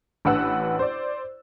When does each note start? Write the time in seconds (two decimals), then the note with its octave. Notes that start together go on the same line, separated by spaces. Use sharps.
0.25 A1 D4 B4 F#5 E6
0.79 C5 D5